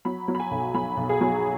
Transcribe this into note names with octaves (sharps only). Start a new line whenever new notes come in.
F#3 B5
F#3
B5
G#5
B1
F#3 B5
B1
G#4
F#3